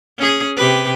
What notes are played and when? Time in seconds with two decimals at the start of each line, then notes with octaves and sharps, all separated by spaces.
0.18 C#4 G#4
0.56 C3 G4 B4